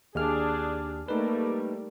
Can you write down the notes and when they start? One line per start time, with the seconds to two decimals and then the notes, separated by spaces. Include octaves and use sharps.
0.15 D#2 D4 G4 G#4 F6
1.08 G3 A3 A#3 D#4 B4